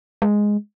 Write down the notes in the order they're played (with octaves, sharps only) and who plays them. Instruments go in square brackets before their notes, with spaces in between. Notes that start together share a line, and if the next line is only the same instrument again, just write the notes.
[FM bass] G#3